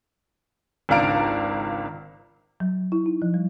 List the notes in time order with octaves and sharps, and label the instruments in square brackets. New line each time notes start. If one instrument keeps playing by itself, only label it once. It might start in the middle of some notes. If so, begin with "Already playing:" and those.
[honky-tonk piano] G#1 C#2 D4 F5 A#5 D7
[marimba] F#3
E4
D#4
F3
G3